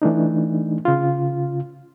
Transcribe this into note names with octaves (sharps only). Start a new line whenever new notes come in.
E3 A3 D4 D#4
C#3 F4